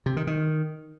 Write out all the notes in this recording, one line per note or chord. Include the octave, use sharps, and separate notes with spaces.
C3
D#3
D#3